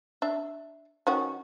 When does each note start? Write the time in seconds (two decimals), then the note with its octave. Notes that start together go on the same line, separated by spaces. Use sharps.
0.22 D4 E5
1.07 D#3 C#4 F#4